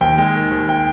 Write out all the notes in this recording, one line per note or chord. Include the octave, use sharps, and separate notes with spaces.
D#2 G5
G#3
D#3
D#2
G5